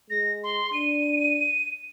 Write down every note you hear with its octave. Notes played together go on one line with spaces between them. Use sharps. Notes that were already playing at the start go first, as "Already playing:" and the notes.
G#3 A#6
C6
D4 D#7